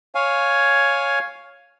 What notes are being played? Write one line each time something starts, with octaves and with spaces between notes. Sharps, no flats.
C#5 F5 G#5